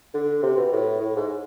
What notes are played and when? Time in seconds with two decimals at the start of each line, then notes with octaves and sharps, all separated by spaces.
0.14 D3
0.43 C3
0.57 B2
0.73 A2
1.01 A2
1.16 G#2